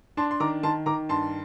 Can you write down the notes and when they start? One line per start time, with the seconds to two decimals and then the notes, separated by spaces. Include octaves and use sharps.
0.17 D4 A5 C6
0.31 C6
0.40 D#3 A#5 D6
0.63 D#3 A5 C6
0.86 D#3 A#5 D6
1.09 G2 A5 C6